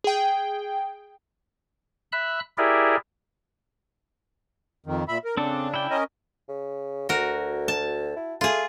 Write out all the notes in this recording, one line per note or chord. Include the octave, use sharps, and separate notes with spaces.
G#4 G5
E5 B5 E6 F#6
E4 G4 G#4 A#4 D5 E5
F2 D#3
A#2 E5 B5
A#4
C#3 C4 D4 A4
E4 G5
C#4 A#4 D#5
C#3
D2 F#4 A#4
A5
E4
A3 F4 G#4